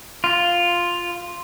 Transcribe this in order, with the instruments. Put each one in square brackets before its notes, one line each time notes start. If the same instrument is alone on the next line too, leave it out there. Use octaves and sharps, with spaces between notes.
[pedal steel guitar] F4